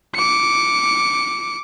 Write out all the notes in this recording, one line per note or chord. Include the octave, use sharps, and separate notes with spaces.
D6 C#7